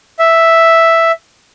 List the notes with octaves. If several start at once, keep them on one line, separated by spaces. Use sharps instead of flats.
E5